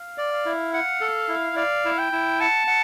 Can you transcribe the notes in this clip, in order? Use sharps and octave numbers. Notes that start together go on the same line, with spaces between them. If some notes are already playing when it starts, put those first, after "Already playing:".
Already playing: F5
D5
F5
E4
F5 F#5
A4
E4
D5 F5
E4
G5
E4
F#5 A5
F#5